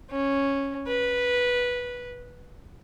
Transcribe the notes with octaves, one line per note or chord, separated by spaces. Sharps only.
C#4
B4